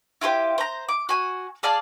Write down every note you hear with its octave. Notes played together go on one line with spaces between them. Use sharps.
E4 F4 G4 C5
C5 A#5
D6
F#4 G#5
G#4 D5 F5 A5